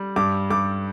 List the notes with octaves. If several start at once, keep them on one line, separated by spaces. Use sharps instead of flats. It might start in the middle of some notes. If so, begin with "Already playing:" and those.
Already playing: G3
G2 D6
G2 D6